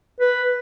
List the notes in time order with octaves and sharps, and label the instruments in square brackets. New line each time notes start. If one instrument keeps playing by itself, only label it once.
[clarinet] B4